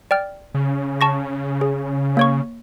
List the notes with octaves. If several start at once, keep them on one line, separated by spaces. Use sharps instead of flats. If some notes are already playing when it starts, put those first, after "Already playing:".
D5 G5 F6
C#3
A5 C#6 A#6
G#4
A#3 C#5 C#6